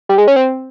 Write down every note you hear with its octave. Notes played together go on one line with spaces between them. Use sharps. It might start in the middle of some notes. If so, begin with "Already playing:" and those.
G3
G#3
C#4
C4